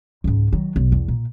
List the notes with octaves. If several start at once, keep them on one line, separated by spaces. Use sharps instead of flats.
C#2 G#2
D#3 F#3
B1
E2
A#2